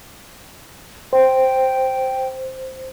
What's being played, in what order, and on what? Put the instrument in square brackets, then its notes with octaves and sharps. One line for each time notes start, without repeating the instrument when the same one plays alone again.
[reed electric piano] C5 [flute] G5